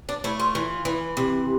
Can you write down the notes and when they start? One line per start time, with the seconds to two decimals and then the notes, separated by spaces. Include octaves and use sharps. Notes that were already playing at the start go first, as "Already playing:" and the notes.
0.09 D4
0.24 A3 E4
0.40 F4
0.55 E3
0.85 E3
1.17 C3